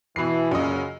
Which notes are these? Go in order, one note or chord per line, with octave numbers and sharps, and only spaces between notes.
B2 E3 C7
C#2 F#2 A#2 C#3 D#5